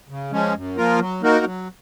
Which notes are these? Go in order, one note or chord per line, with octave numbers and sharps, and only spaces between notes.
C#3
F3 G#3 C#4
F#2
F3 A#3 F4 A#4
F#3
A#3 D#4 F#4 A#4
F#3